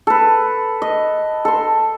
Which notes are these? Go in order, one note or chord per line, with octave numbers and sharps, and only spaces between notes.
A4 B4
D#5
A4 C6